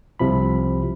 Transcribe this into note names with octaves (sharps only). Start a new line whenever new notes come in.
C2 C3 F3 B5